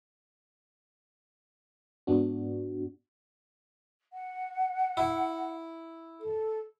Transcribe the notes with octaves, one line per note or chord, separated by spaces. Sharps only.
G#2 B3 D4 F#4
F#5
E4
A4